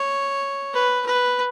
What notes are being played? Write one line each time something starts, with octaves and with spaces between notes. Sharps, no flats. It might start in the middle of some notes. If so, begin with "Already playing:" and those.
Already playing: C#5
B4
B4